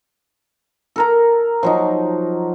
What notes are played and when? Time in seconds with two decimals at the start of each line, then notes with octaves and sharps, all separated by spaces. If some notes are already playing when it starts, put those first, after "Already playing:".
0.96 A4 A#4 A#5
1.63 F3 F#3 D#4